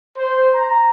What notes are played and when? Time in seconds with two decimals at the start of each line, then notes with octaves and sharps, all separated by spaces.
0.16 C5
0.53 A#5